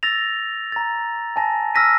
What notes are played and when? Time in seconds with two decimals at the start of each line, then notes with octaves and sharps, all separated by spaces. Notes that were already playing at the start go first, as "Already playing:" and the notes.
0.03 E6 A6 A#6 F7
0.72 A#5 A6
1.36 G#5 A5 A#6
1.74 E6 F6 A#6 B6 D#7